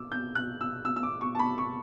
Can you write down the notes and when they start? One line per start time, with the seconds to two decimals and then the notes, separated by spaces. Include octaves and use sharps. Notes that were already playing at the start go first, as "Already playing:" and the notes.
Already playing: D6 E6
0.12 G6
0.35 F#6
0.61 E6
0.85 E6
0.96 E6
1.03 D6
1.21 C#6
1.35 A5
1.39 B5
1.58 C#6